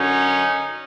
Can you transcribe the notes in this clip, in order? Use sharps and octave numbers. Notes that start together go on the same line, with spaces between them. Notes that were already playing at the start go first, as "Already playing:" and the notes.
Already playing: F#2 D3 F#3 C#4 D#4